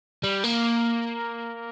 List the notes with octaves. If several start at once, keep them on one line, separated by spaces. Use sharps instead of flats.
G3
A#3